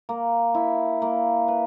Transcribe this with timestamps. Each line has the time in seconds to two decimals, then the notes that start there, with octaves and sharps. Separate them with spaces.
0.09 A#3
0.55 E4
1.02 A#3
1.48 B4